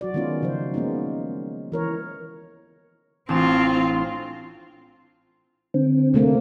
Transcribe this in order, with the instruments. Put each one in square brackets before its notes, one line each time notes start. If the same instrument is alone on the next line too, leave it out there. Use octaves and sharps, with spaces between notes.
[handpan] F#3 F#4 D5
D#3 G#3 B3 C#4 D#4 F4
C#3 F3 F#3 C5
G#3 A#3 B3 C#4 D#4
E3 A#4 C#5
[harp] A1 D4 E7 [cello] C4 F4
[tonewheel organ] D3 C4
[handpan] C3 A3 A#3